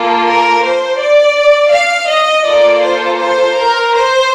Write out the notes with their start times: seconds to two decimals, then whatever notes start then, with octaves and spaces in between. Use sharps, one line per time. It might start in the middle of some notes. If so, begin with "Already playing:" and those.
Already playing: A#3 F4 A4
0.27 A#4
0.63 C5
1.00 D5
1.73 F5
2.09 D#5
2.46 A#3 F4 A4 D5
2.82 C5
3.19 C5
3.55 A#4
3.91 C5